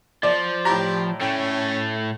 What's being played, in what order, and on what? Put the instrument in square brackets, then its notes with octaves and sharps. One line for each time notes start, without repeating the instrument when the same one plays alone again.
[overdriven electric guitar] F3 [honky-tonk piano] D5
[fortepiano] A2 A#5 [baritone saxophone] G4
[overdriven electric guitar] A2 A3 [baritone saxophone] C#4 [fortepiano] G5